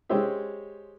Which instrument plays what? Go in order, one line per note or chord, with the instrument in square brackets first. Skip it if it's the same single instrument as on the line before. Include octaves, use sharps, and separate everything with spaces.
[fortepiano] G#3 C#4 G4 C5 E5